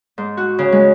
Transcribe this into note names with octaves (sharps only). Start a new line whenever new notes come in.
G#2
F#4
C#3
G#3